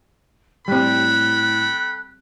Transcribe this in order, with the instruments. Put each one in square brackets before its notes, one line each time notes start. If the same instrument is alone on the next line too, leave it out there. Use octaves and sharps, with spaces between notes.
[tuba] A2 [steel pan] G3 C4 [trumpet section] A4 G5 B5 [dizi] F#6